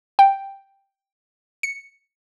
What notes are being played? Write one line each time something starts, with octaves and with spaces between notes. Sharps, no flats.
G5
C#7